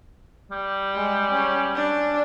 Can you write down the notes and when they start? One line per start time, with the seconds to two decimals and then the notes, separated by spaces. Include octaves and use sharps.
0.51 G3
0.95 G#3
1.31 C#4
1.75 D4